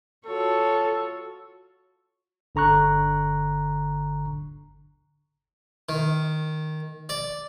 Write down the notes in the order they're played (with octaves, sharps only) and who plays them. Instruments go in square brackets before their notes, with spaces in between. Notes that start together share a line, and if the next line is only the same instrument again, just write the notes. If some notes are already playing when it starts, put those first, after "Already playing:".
[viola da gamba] F4 F#4 C#5 [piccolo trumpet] A4
[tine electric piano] G1 D3 A#5 C#6 F#6
[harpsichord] D#3
D5